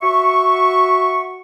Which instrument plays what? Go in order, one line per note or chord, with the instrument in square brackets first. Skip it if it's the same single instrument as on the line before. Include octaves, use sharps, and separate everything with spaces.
[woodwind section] F#4 E5 C#6